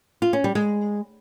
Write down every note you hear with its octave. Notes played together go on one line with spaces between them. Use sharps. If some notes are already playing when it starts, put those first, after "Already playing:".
F4
C#4
G3
G#3